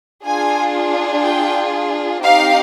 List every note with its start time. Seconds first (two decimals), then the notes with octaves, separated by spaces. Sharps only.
0.25 D4 F4 G#4 G#5
1.24 G5
2.23 C4 D#4 G4 F5